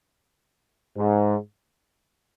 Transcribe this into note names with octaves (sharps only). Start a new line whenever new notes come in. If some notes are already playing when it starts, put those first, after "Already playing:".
G#2